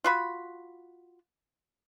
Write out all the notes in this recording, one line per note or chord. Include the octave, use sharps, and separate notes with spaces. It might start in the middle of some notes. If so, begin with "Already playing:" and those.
F4 F#4 B5